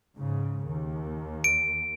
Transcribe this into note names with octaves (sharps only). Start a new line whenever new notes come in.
G#2 C#3
D#2
D7